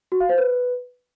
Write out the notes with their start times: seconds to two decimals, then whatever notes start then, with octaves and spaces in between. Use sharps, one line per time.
0.12 F#4
0.20 F5
0.29 C5
0.38 B4